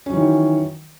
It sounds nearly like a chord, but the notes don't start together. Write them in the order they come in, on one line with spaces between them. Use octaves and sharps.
C#4 F#3 E3 D#3